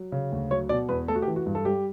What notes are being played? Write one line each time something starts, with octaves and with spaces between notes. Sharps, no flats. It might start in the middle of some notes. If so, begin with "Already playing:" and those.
Already playing: F#3
C#3
D2
F#3 C#5
B2 D5
E2 B4
A3 A4
F#4
G4
E3
F#4
G2
A4
G3 G4